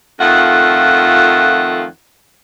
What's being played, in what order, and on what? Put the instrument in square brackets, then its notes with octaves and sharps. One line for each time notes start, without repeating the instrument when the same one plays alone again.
[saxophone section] F2 D#3 A3 F4 F#5